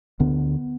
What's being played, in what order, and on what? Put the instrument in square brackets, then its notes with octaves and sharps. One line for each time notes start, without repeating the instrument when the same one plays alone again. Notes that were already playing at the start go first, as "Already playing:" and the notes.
[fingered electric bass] D2 D3 B3